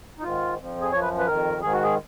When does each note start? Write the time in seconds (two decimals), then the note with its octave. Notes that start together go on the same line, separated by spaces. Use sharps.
0.19 D#4
0.23 G#2 D#3 F4
0.58 F2 F3
0.81 G#4
0.92 F#2 F3 C#5
1.01 B4
1.19 B4
1.27 F2 D#3 A#4
1.62 G#2 D#3 G#4
1.73 F#4
1.84 G#4